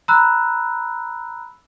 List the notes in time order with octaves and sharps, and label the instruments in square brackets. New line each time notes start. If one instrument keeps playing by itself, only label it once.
[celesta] A#5 B5 E6 F#6